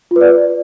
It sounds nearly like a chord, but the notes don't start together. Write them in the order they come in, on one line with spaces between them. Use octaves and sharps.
F4 B4 D5